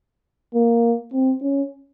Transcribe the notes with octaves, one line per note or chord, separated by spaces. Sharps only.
A#3
C4
C#4